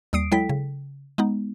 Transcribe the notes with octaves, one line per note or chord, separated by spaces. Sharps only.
D#2 G3 D#6 C7 D7
F#3 G#3 E4 A4 G5 B6
C#3
G#3 B3 D#4